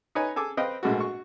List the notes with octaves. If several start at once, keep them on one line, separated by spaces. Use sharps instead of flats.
D#4 B4 C#5 G#5
G#4 A4 G#5 D6
C4 B4 D#5 F5 G5
A#1 G#2 A3 F#4
F#4 C#6